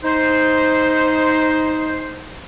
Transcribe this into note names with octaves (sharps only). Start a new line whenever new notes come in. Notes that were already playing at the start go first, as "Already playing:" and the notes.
D#4 C5